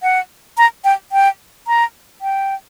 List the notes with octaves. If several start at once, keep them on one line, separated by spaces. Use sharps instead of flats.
F#5
A#5
G5
G5
A#5
G5